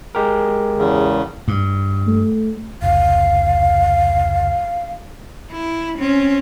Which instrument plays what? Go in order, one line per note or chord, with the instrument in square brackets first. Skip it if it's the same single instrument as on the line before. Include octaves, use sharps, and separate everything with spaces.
[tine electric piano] G#3 G4 A#4
[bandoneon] E2 C#3
[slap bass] G2
[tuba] A3
[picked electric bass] F1 C#2 [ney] F5
[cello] E4
C4 C#4